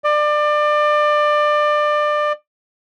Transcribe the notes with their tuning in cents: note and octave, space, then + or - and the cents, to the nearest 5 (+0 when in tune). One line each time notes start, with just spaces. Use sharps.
D5 +25